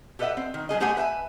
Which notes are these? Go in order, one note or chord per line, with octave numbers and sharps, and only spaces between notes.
G4 A4 B4 D#5 E5 F#5
C4
D#3
F#3 A3 G#4 D#5
A3 G4 G#4 C5 F#5 G#5
B4 E5 G5 G#5